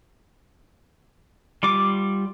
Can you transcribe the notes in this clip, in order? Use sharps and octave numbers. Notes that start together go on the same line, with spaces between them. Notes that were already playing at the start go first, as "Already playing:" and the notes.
G3 F4 D6